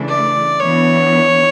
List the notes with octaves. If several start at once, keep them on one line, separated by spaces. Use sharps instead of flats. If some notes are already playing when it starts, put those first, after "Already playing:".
Already playing: C#3 E3 A3 D4
D5
E3 B3 D4 C#5